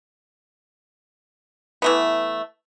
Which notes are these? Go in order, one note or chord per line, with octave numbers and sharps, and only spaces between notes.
E3 A3 B3